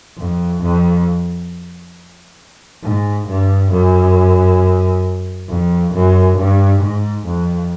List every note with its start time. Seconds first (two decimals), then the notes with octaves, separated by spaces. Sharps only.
0.18 F2
0.63 F2
2.83 G#2
3.28 G2
3.72 F#2
5.49 F2
5.94 F#2
6.38 G2
6.82 G#2
7.26 F2